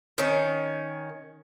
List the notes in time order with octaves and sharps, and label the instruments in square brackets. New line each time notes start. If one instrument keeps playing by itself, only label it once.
[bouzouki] D#3 C#4